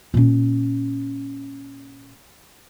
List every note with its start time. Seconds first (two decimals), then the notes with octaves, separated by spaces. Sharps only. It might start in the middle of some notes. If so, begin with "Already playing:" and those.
0.14 A#2 C#4